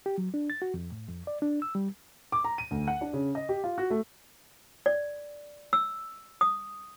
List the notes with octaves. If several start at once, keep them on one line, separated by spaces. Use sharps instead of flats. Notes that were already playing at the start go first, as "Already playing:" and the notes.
G4
F#3
D4
A6
F#4
F2
A2
F2
D5
D4
E6
G3
D6
A#5
D#7
D2
F#5
D4
C#3
D#5
G4
F4
F#4
A3
D5
E6
D#6